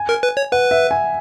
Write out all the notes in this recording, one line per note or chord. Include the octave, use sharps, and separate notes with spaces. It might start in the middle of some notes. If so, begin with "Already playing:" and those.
Already playing: G#5
A#4
B4
C#5
B4 F#5
E5
G#5